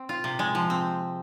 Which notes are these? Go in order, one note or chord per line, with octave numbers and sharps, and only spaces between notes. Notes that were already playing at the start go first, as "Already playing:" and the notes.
Already playing: C4
F4
C3
G#3
F3
C4